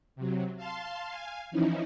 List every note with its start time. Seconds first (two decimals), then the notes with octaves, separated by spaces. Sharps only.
0.16 C3 F#3
0.57 F5 A5 C6
1.09 F5 G#5
1.51 E3 F3 C#4 D#4 E4